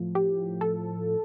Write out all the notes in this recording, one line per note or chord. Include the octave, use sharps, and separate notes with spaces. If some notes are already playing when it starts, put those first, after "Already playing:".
Already playing: A2 F3
G4
A4